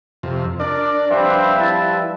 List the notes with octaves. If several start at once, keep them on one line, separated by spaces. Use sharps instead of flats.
F2 C3
D4 A#4 D5
F3 G3 C4 B4 E5
E4 A5